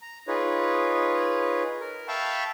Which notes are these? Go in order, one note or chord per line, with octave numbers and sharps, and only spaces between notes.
A#5
D#4 F4 G#4 B4 C#5
A#4
E5 F5 G5 A5 B5 C#6